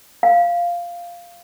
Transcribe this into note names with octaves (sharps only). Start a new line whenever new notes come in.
F5